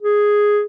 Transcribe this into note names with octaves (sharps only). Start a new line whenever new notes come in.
G#4